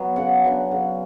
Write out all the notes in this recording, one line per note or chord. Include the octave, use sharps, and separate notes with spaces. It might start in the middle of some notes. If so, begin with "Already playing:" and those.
Already playing: F#3 B3
C#3 F#5
F#3 B3 D4
C#3